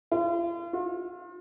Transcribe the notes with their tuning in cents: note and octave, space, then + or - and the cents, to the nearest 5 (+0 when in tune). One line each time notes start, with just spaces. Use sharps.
F4 -40
F4 +40